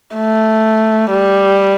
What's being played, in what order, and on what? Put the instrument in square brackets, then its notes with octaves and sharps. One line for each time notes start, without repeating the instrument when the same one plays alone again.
[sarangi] A3
G3